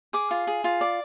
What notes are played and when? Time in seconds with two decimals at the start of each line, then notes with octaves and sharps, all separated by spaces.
0.13 G#4 D6
0.31 F4
0.47 G#4
0.64 F4
0.81 D5